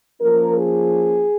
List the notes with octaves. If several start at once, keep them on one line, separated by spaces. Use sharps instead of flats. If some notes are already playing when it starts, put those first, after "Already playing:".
F3 A#3 C#4 A#4
G#4